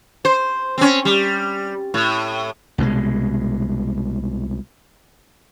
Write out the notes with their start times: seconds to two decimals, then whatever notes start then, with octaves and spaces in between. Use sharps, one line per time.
0.25 C5
0.78 C4 C#4
1.05 G3
1.94 A2
2.78 C2 B2 F3 G#3